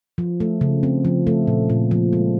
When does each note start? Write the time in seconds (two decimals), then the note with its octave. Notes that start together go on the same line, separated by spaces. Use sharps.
0.18 F3
0.40 A3
0.61 C#3
0.83 C4
1.05 F3
1.27 A3
1.47 A#2
1.70 A#2
1.91 F3
2.13 G#3